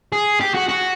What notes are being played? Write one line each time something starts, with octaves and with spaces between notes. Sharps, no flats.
G#4
G4
F#4
F#4